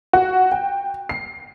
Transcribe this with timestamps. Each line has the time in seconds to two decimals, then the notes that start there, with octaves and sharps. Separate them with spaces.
0.13 F#4
0.52 G5
1.09 C7